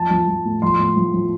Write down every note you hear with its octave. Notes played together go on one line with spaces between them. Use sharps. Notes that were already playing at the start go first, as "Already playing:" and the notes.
Already playing: F3 A5
F3
F3
A2
F3 C6
A2
F3
F3